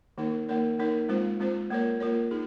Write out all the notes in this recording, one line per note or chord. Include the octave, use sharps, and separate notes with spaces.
D#3 A#3 D#4 A#4
A#3 D#4 A#4 C#5
A#3 D#4 A#4 C#5
G#3 C4 F4 C5
G#3 C4 F4 C5
A#3 F4 A#4 C#5
A#3 F4 A#4 C#5
D#4 G#4